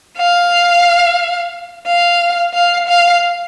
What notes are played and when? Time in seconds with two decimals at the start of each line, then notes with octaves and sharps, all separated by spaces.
0.17 F5
1.87 F5
2.54 F5
2.88 F5